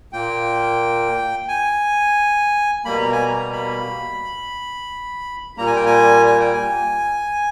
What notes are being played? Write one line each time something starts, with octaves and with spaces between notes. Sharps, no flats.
A#2 A#3 G5
G#5
B2 G3 A#3 B5
A#5
G#5
A#5
B5
A#2 G3 A#3 A#5
G#5
G5
G#5
G#5
G5
G#5